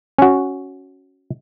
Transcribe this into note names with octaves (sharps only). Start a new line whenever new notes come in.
C#4 F#4